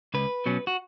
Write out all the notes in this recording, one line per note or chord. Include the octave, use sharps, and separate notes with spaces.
C#2 B4
B2 F#3 C#4
F#4